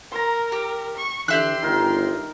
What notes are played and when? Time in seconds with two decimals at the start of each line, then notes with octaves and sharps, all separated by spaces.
0.12 A#4 A#5 C6
0.52 G4
0.97 C#6
1.28 D3 E3 G4 E5 C6 F#6
1.62 G1 D#3 A#4